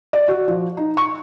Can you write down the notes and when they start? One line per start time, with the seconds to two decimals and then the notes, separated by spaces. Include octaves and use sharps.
0.13 D5
0.28 F#4
0.48 F3
0.77 D#4
0.97 C#6